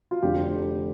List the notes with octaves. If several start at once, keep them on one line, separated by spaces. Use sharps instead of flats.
F4
F1 F2 D3 G4